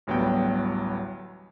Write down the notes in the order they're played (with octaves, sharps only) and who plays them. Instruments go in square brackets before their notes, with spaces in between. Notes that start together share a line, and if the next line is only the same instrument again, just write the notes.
[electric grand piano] A1 D2 F#3 G3 B3 G5